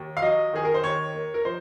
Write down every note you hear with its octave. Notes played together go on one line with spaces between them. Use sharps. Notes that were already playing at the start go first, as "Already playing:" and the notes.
Already playing: D#2
F5
F#3 D#5
D#3 G#4
A#4
C5
D#2 C#5
A#3
A#4
F3 C5